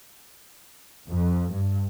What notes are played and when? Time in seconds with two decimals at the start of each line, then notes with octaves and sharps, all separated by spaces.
1.10 F2
1.53 G2